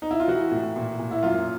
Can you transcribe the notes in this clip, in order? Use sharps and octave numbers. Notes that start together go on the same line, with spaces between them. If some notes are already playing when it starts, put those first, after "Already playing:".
D#4
E4
F4
E3 F#4
A2
A#2
A#2
E4
F#2 F4